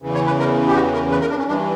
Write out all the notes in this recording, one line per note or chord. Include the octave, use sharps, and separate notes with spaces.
E2 C#3 E3
C#5
B4
A#4
G4
F#4
A#4
B4
A#4
D4
C#4
G2 E3 D4